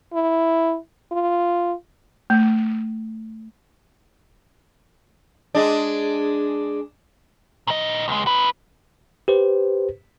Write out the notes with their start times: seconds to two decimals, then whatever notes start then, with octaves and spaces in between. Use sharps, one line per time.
0.13 E4
1.12 F4
2.30 A3
5.55 G#3 D4
7.67 A#2 D#5
8.08 C#2 G#3
8.27 D#4 B4
9.28 G4 B4 C5